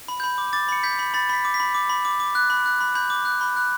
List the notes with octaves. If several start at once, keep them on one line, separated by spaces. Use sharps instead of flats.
B5
B5 G6
D6
D6 A6
B5 C#7
G6 B6
B5
B5 A6
B5 B6
D6
B6
B5
D6
B5
D6
D6
F#6
B5
F#6
B5
B5 G6
D6
F#6
B5
F#6